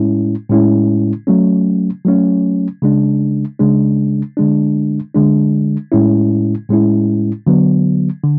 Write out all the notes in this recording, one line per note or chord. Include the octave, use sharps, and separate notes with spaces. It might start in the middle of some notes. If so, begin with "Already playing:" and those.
Already playing: A2 G#3 C#4 E4
A2 G#3 C#4 E4
F#3 A3 C#4
F#3 A3 C#4
C#3 G#3 D4
C#3 G#3 D4
D3 G#3 D4
D3 G#3 D4
A2 G#3 C#4 E4
A2 G#3 C#4 E4
D3 F#3 B3
D3